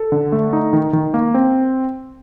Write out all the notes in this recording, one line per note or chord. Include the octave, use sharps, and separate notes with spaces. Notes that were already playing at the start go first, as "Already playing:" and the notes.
Already playing: A4
D3
A3
D#4
D#3
D#3
A#3
C4